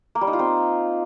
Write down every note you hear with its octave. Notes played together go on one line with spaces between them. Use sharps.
A#3
G3
D#4
F4
C4